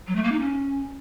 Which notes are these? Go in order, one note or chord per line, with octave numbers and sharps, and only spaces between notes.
F#3
A3
A#3
D#4
C#4